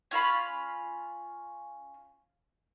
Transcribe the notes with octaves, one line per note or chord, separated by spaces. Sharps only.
C#4 F4 F5 B5